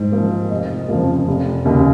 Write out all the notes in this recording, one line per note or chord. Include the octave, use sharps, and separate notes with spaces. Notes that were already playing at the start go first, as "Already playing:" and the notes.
Already playing: G#2
F3 A#3
F1 D#5
F2 C#3 F3 A#3
F1
D#2 C#3